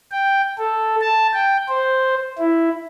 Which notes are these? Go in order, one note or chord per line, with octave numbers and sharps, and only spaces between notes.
G5
A4
A5
G5
C5
E4